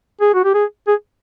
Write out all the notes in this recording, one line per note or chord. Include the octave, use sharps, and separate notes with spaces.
G#4
F#4
G4
G#4
G#4